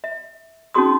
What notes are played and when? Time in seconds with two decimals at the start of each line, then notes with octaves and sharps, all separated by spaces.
0.04 E5
0.74 C#4 D#4 F#4 G#4 C6 D#6